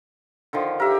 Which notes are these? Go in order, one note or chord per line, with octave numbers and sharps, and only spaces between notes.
D3 D#3 F3
G4 A#4 E5